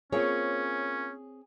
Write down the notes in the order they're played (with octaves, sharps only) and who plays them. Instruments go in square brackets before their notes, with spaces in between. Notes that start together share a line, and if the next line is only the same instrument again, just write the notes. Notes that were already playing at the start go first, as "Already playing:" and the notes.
[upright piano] A#3 F4 [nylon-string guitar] C4 C#5 [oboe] C#4 [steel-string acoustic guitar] G#4